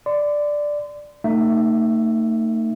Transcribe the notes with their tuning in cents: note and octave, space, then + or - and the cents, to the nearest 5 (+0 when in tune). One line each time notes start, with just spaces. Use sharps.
D5 +0 C6 -35
A3 +40 D#4 -10 E5 +10